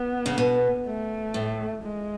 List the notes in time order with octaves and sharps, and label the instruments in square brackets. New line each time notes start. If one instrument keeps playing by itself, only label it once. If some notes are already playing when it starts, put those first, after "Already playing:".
Already playing: [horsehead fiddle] B3
[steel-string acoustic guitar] C#3
B2
[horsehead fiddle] A3
[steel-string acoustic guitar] A2
[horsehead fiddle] G#3